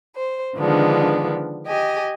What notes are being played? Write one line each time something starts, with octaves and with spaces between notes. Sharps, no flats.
C5
D3 D#3 F3 G#3 B3 D4
G4 D#5 G#5